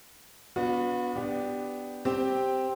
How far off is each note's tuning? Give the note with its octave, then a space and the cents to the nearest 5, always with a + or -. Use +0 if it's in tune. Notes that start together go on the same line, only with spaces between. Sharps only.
B3 +0 D4 -20 F#4 -45
B3 +10 D4 +0 G4 +0
C4 +0 G4 +0